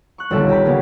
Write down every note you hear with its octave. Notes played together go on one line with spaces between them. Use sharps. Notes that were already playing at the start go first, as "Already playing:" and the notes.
C#6 F#6
D#1 B1 D3 G3 A4
F#4 G4 A#5 B5
C#3 A#3 B3 C#4